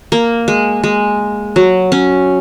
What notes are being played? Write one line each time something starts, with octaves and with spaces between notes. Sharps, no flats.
A#3
G#3
G#3
F#3
C#4